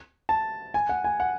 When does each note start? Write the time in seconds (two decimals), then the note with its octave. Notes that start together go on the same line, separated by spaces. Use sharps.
0.29 A5
0.74 G#5
0.89 F#5
1.04 G#5
1.20 F#5